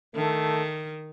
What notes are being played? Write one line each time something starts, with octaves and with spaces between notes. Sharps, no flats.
D#3 A3